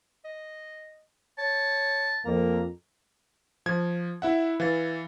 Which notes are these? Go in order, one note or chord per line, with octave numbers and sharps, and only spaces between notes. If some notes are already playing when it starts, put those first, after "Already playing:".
D#5
C#5 A5
F2 A#3 A#5
F3 G#6
E4 E5 F#5
E3 F5 A6